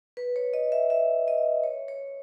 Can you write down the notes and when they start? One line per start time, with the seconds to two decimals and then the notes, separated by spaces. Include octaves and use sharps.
0.17 B4
0.36 C#5
0.54 D#5
0.72 E5
0.90 E5
1.28 D#5
1.63 C#5
1.88 C#5